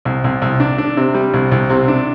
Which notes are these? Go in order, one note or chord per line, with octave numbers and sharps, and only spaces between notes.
C2
C2
C2
D4
D4
C3
G3
C2
C2
C3
D4